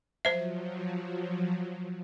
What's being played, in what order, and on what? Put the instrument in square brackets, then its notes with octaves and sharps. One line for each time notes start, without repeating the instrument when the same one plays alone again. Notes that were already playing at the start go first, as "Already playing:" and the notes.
[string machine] F3 F#3 [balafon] C5 E5